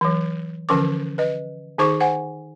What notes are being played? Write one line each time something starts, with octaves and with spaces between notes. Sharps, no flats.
E3 F#3
D3 E3 F3 C#4 A#4 D6
B4 D#5
D#3 D#4 G#4 C5 C#6 D6
C5 F#5 G#5